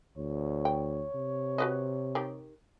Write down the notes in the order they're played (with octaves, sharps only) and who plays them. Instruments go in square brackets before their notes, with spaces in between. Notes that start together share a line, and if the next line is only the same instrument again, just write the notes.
[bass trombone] D2 [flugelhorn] C#5
[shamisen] G5
[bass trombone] C3
[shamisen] F#4 B4 D#5
D#3 G4